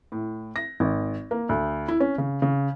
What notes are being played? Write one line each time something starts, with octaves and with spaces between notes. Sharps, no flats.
A2
A#6
G#1
A#3
D2
E4
C#4
C#3
C#3